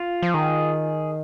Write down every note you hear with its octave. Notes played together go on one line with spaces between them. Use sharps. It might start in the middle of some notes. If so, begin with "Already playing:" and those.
Already playing: F4
F3
D#3 G#4